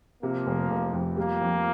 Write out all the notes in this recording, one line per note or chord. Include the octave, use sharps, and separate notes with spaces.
C3 F3 A#3
F1
F1
F2
F3 G3 A#3
F2